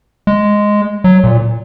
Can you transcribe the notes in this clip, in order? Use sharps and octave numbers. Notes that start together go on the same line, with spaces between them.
G#3
F#3
A#2